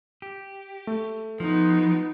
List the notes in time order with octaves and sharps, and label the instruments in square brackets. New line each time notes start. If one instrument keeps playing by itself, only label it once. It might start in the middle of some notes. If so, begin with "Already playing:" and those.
[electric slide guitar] G4
[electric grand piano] A3
[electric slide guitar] F3 [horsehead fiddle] B3 D#4